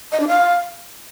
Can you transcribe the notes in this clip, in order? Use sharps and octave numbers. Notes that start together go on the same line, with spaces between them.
D#5
D4
F5